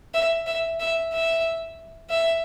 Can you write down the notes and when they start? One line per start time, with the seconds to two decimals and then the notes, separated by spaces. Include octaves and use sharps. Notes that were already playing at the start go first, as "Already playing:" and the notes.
0.14 E5
0.46 E5
0.80 E5
1.13 E5
2.10 E5